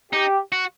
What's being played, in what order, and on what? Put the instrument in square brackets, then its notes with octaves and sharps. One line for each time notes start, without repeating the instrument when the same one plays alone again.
[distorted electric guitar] D#4 [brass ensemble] G4
[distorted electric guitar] F#4